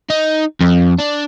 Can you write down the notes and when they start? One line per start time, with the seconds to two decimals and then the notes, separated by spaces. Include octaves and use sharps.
0.10 D#4
0.60 F2
0.99 D4